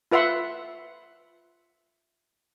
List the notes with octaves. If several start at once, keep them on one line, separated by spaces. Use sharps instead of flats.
F4 B4 E5 F#5 C6